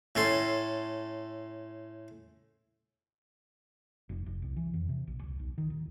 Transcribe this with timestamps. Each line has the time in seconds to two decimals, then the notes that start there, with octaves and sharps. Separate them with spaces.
0.15 A2 C#4 A4 C6
4.09 F1
4.26 F1
4.42 C2
4.57 E3
4.74 F2
4.89 C3
5.07 A#1
5.23 C#2
5.39 B1
5.58 D#3
5.70 D1